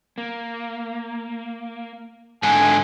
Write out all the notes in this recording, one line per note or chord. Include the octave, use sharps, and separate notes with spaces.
A#3
G#2 D3 G#5